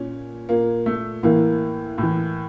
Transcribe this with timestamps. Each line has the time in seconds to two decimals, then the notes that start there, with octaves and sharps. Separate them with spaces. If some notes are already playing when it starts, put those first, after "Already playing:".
Already playing: A#2 C#4
0.49 A#2 A#3
0.86 A3
1.23 A2 E3 A#3
1.98 A2 E3